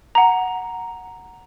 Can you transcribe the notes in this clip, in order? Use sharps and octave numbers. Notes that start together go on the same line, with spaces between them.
F#5 A#5